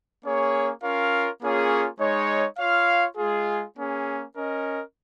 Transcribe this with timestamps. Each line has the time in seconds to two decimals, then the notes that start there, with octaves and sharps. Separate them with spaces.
0.24 A#3 C#4 G#4 C#5
0.82 C#4 F4 A#4 C#5 F5
1.41 A#3 C#4 F4 G#4 C#5
1.99 G#3 D#4 C#5
2.58 F4 C#5 F5
3.17 G#3 F4 G#4
3.75 A#3 C#4 G#4
4.34 C#4 A#4 D#5